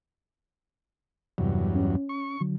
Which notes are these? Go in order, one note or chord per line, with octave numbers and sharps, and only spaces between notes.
E2 G2 C3 F#3
C#4
C#6
D3 F#3